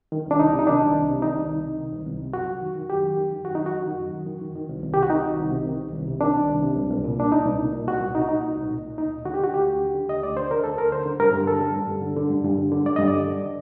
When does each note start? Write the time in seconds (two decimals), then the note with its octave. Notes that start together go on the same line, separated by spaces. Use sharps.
0.12 D#3
0.26 C2
0.31 D4
0.39 C2 D#4
0.53 C3
0.59 D#4
0.67 D#3 D4
0.82 C2
0.95 C2
1.09 C3
1.22 D#3 D#4
1.37 C2
1.51 C2
1.64 C3
1.78 D#3
1.93 C2
2.06 C2
2.20 C3
2.33 F#2 F#4
2.48 F#2
2.62 D#3
2.75 D#3
2.89 F#2 G4
3.03 F#2
3.16 D#3
3.31 D#3
3.44 F#2 F#4
3.55 F#2 D#4
3.66 F#4
3.72 D#3
3.86 D#3
4.00 F#2
4.14 F#2
4.27 D#3
4.41 D#3
4.56 D#3
4.69 C2
4.82 C2
4.94 G4
4.97 C3
5.03 F#4
5.10 D#3 D#4
5.24 C2
5.39 C2
5.51 C3
5.66 D#3
5.80 C2
5.93 C2
6.08 C3
6.21 D#3 D4
6.35 C2
6.49 C2
6.63 C3
6.76 C2
6.90 C2
7.04 A#2
7.18 A#2 D4
7.31 C2 D#4
7.46 C2
7.59 A#2
7.73 A#2
7.87 C2 F#4
8.01 C2
8.15 A#2 D#4
8.22 F#4
8.29 A#2 D#4
8.43 C2
8.57 C2
8.71 A#2
8.84 A#2
8.98 D2 D#4
9.12 D2
9.25 D3 F#4
9.34 G4
9.40 D3 F#4
9.53 D2 G4
9.67 D2
9.81 D3
9.94 D3
10.09 D2 D#5
10.23 D2 D5
10.36 D3 C5
10.51 D3 A#4
10.64 D2 A4
10.78 D2 A#4
10.92 D3 C5
11.06 D3
11.20 G2 A#4
11.33 G2
11.48 D3 A4
11.61 D3
11.75 G2
11.88 G2
12.02 D3
12.17 D3
12.31 G2
12.44 G2
12.57 D3
12.72 D3
12.85 G2 D5
12.96 G2 D#5
13.08 D5
13.13 D3
13.27 D3